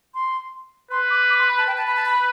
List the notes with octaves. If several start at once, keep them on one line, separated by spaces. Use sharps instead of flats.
C6
B4 C6
D6
D6
C6
B5
A5
B4 G5
A5
B5
A5
B5